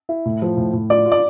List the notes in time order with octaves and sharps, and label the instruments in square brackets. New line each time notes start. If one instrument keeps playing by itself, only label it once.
[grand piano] E4
A2
F3
A2
A2
[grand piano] F4 [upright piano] D5
[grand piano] F4
[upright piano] D5